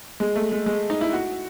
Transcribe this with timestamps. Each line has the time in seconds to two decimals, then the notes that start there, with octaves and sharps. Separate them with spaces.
0.20 G#3
0.36 A3
0.52 G#3
0.66 G#3
0.90 D#4
1.01 E4
1.13 F#4